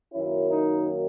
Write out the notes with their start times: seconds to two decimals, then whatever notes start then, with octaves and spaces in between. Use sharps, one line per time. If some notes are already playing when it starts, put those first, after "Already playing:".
0.13 F#2 D#3 F#3 A#3 C#4 E4
0.50 D#4